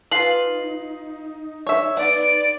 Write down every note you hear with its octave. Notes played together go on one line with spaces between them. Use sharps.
D#4 F4 B4 C7 F#7
C#5 E5
B3 D5